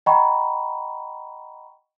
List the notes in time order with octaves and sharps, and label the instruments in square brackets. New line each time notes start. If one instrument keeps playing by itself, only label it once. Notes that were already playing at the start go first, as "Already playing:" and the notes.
[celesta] D#5 F#5 G5 A#5 B5 C#6